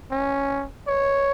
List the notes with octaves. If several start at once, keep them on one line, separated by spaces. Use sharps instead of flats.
C#4
C#5